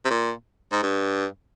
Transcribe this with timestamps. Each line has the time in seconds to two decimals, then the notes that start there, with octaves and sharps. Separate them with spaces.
0.05 C3
0.11 A#2
0.72 G#2
0.83 G2